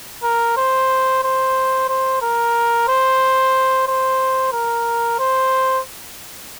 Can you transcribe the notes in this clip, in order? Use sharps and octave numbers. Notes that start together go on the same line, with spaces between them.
A#4
C5
C5
C5
A#4
C5
C5
A#4
C5